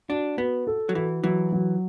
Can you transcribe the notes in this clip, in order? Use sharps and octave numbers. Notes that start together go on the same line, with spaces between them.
D4 F#4
B3 F#4
A4
F#3
E3 F#4
E3 F#3
F#3